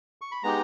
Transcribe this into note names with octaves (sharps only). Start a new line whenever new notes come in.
C#6
B5
G#3 B3 D#4 G4 A#5